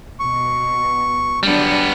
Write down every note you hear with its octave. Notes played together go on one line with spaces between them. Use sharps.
B2 C#6
F#3 G3 B3 D4